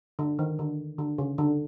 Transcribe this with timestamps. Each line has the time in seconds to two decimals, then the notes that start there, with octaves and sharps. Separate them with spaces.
0.19 D3
0.39 D#3
0.59 D3
0.99 D3
1.18 C#3
1.38 D3